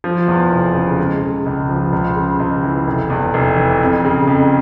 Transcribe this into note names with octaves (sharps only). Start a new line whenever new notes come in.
F3
E2
F1
C#3
G#3
C#3
C#2
F3
C#2
C#3
C#2
E3
F1
E2
F1
E3
F2
C#3
F2